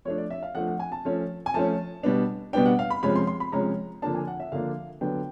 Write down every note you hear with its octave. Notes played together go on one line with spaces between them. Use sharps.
F3 A3 D4 C#5
D5
E5
F5
F3 A3 D4 F#5
F#5
G#5
A5
F3 A3 C#4
G#5
F3 A3 C#4 A5
B2 G3 B3 D4
B2 G3 B3 D4 G5
F#5
F5
B5
C3 F3 G#3 C#4 B5
C6
C6
B5
C3 F3 G#3 C#4 A#5
D3 F3 A#3 D4 A5
G#5
F#5
E5
D3 F3 A#3 D4 F5
D3 F#3 B3 D4 G5